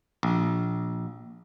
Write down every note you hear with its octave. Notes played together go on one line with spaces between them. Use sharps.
A#1